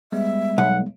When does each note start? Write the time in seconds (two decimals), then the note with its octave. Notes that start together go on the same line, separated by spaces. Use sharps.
0.12 G3 G#3 B3 E5
0.58 B1 F#5